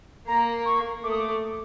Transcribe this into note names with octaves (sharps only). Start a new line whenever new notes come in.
A#3 A#5
C#6
A3 D6
D#6
D6